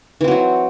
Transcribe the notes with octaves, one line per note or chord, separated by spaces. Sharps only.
E3 F#3 C4 F#4